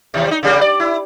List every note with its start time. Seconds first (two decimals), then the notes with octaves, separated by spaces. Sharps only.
0.14 D#2 C3
0.27 G3 D#4
0.43 C#3 G3 A#3
0.61 D5
0.80 E4